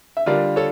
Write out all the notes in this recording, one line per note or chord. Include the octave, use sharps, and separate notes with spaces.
E5
D3 G3 D4 F4 A#4 D5
A4 C#5